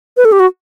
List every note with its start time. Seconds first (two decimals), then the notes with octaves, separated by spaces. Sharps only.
0.17 B4
0.25 A4
0.32 G4
0.40 F#4